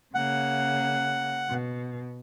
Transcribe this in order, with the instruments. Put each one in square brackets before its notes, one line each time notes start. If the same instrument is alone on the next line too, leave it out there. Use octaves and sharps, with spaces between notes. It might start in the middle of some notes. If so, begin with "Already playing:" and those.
[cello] C#3 A#3 [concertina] F#5
[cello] B2